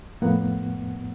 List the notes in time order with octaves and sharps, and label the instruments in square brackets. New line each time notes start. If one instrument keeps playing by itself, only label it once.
[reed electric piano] F2 A2 A#3 B3 F#5